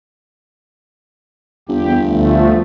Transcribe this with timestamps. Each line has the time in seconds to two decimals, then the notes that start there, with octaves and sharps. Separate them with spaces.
1.69 G1 E2 G4
2.06 D2 F3 A3